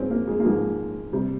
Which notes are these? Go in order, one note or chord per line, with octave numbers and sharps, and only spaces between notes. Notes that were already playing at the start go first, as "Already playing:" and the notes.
Already playing: G#2 F3 G#3 C4 C#4
A#3
G#3
A#3
G#2 F3 G#3
C3 G3